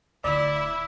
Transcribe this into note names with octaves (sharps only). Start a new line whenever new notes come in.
D1 D3 E4 D5 E5